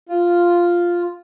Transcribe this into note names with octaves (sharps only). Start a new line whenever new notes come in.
F4